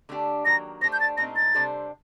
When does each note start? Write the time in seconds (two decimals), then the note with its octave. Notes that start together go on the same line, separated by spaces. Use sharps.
0.09 D3 A3 D4 G4
0.45 D#3 F#3 A#3 A#6
0.81 A3 D4 G4 C5 A#6
0.93 G6
1.00 A6
1.17 A#2 A3 C4 D#4 A#6
1.36 A6
1.55 C3 G3 D4 A4 C5